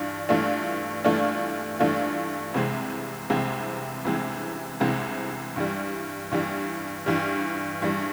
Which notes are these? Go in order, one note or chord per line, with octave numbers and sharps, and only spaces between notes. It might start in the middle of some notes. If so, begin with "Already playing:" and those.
Already playing: G2 E3 D4 F4
G2 E3 A3 D4 F4
G2 E3 A3 D4 F4
G2 E3 A3 D4 F4
C2 C3 E3 G#3 C4
C2 C3 E3 G#3 C4
C2 C3 E3 G#3 C4
C2 C3 E3 G#3 C4
G2 E3 G3
G2 E3 G3
G2 E3 G3
G2 E3 G3